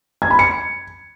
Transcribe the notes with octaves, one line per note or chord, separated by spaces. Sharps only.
G#6
B5
C#7